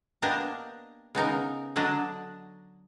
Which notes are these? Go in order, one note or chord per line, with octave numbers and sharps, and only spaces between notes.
A#3 B3 D4 G4 A#4 D#5
C#3 B3 D#4 A#4
D3 F#3 D4 D#5